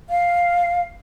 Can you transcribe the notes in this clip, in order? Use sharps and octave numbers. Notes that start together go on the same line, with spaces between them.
F5